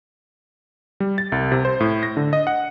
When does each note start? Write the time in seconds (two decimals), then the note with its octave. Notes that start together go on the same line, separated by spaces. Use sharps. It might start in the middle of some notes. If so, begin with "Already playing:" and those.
1.00 G3
1.18 A6
1.32 C2
1.52 C3
1.65 C5
1.80 A2
2.03 A#6
2.17 D3
2.33 D#5
2.47 F#5